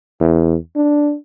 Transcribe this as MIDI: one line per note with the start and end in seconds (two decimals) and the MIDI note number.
0.21 0.56 40
0.76 1.16 62